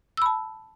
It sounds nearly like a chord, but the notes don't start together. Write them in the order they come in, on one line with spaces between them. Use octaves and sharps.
E6 B5 A5